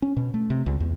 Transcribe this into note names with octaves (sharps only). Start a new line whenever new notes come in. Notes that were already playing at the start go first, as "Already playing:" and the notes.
C#4
B2
A3
C3
C#2
E2